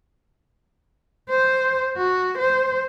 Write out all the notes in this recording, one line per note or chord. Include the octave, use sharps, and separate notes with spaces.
C5
F#4
C5